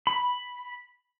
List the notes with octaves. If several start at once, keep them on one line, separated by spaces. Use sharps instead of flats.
B5